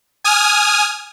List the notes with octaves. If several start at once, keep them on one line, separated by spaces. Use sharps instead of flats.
G#5 D#6 F6